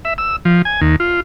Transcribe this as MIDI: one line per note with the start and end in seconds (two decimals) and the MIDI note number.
0.05 0.14 76
0.18 0.36 88
0.45 0.62 53
0.65 0.81 80
0.81 0.96 39
1.00 1.20 65